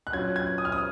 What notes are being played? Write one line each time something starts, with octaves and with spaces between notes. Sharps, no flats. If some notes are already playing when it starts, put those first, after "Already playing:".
F#6
F#3 C#4 F4 G#6
G#6
D#6
F6
D#6